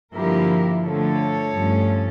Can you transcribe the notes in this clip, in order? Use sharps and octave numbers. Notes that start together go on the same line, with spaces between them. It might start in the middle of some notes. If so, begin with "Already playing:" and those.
G2 D3 F3 A#3 E4 G4 A#4
D3 F3 A3 A4 C#5
G2 F3 A3 C#4